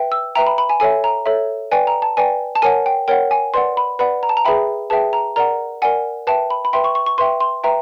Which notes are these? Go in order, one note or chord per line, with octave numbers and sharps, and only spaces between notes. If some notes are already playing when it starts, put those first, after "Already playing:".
Already playing: B4 E5 G5
E6
B4 E5 G5 A#5
B5
B5
G#5
A4 C#5 E5 G#5
A#5
A4 C#5 E5
B4 D5 G5 G#5
A#5
A5
B4 D5 G5 G#5
A5
A#4 C#5 F#5 G#5
G5
A#4 C#5 F#5 G5
G#5
B4 D5 F#5 C6
B5
B4 D5 F#5 B5
A#5
A5
A#5
G#4 B4 E5 G5 B5
G#4 B4 E5 G5 A5
A#5
A#4 D5 F#5 A#5
A#4 D5 F#5 G#5
B4 E5 G5 A5
B5
B5
B4 E5 G5 C6
C#6
C#6
C#6
B4 E5 G5 C6
C6
B4 E5 G5 A#5